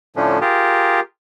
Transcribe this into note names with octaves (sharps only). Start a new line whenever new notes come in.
A2 D3 F3 A3 C#4 D4
F4 G4 G#4 A#4